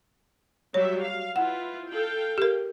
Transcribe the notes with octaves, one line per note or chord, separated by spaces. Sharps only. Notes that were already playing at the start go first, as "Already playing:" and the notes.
F#3 G3 C#5 E5
F5
E4 F4 B4 F#5
A4 F5 G5
G4 A#4